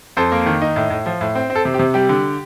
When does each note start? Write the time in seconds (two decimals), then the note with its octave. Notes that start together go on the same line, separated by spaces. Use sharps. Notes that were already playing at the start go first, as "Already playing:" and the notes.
0.17 F2 A4 C5
0.32 A#3
0.46 D#3
0.62 D#4
0.76 A2
0.90 A2
1.06 F3
1.21 A2
1.35 C4
1.50 C4
1.55 A4
1.65 C3
1.74 G4
1.79 C3
1.94 G3 G4
2.09 D3